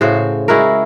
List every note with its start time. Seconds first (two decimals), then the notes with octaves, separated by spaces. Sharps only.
0.01 A2 C#3 F#4 C5
0.48 G#3 E4 F#4 A#4